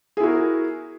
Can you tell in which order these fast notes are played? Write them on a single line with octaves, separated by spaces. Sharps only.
G#4 E4 F#4 A#4